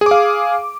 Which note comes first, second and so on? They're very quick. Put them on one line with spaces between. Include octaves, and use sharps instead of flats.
G#4 D6 F5